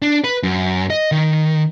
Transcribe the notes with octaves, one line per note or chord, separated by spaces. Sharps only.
D4
B4
F#2
D#5
D#3